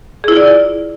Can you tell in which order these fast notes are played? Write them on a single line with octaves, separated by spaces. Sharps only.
G#4 E4 F4 D5